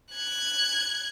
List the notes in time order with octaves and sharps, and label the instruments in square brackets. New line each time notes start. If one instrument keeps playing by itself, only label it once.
[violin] F#6 G#6